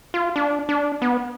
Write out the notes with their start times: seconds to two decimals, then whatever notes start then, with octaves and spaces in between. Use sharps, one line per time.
0.14 F4
0.36 D4
0.69 D4
1.02 B3